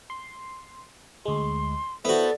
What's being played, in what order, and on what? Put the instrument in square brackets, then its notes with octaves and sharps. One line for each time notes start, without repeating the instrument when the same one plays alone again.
[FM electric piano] C6
[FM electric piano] D2 G#3 [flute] C6
[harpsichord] B3 F#4 [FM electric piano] E4 [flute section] A4 D5 [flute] C5